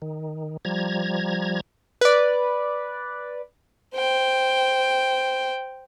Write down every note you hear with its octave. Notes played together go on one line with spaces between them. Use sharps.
D#3
F3 G3 A#5 G#6
B4 D5
C5 G5